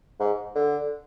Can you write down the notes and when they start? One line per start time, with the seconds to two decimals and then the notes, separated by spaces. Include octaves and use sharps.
0.20 G#2
0.55 D3